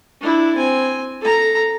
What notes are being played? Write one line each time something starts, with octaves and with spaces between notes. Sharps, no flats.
D4 E4
C4 G#5
A4 A#5